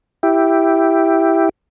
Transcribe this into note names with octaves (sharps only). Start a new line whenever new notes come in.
E4 G4